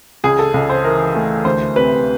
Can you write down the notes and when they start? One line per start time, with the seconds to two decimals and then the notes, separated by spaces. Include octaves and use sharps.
0.24 C#2 G#4
0.39 A4
0.54 C#2
0.70 C5
0.84 E3 A#4
1.15 A3
1.45 D2 C5
1.76 C3 B4